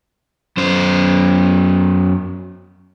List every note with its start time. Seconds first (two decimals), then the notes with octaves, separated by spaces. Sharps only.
0.57 F#2 C5